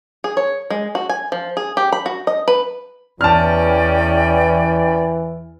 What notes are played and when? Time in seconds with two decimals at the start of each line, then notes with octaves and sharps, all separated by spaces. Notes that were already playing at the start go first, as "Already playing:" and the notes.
0.24 G#4
0.37 C#5
0.70 G#3
0.95 F#4
1.09 G#5
1.32 F3
1.57 G#4
1.77 G4
1.92 B5
2.06 F#4
2.27 D#5
2.48 B4
3.21 E2 E3 C#4 D5 G5 A5 F6